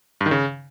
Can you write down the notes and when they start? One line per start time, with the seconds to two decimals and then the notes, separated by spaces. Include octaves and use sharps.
0.21 G2
0.26 D#3
0.31 C#3